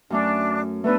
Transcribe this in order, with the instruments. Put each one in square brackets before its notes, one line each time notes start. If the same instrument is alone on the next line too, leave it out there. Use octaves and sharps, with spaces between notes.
[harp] F#2 A3 C#4 [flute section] D4
[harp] A3 B3 D4 [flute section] A4 B4